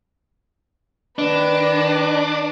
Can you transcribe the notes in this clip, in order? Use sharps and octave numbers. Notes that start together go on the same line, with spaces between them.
D#3 D4 B4